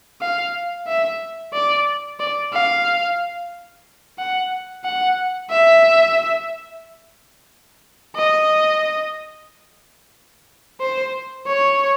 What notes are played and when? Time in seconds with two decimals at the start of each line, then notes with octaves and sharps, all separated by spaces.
0.21 F5
0.87 E5
1.53 D5
2.20 D5
2.53 F5
4.19 F#5
4.84 F#5
5.50 E5
8.16 D#5
10.80 C5
11.47 C#5